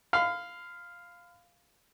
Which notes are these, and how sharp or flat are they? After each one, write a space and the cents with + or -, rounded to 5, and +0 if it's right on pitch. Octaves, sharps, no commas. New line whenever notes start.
F5 +0 B5 +45